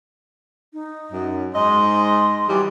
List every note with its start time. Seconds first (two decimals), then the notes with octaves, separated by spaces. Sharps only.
0.73 D#4
1.11 F#2
1.54 G#2 D#5 C6
2.48 E3 F#3 G3